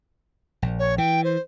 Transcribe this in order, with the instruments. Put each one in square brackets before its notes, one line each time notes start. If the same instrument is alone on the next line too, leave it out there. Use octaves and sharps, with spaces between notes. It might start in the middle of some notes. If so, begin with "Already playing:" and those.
[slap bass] A#1
[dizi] C#5
[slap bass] E3 [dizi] G5
[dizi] C5